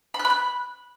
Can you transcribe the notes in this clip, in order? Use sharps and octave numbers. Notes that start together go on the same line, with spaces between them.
B5
F#6
B5
F#6